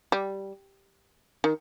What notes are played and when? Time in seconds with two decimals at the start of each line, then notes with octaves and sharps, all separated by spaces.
0.12 G3
1.44 D#3